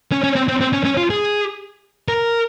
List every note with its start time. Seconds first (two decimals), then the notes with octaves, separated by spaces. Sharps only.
0.12 C#4
0.24 C#4
0.35 C4
0.48 C4
0.61 C4
0.73 C#4
0.85 C#4
0.97 F4
1.10 G#4
2.08 A#4